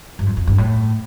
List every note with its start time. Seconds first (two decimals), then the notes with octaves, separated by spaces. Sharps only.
0.19 G2
0.26 F2
0.37 F2
0.47 G2
0.58 A2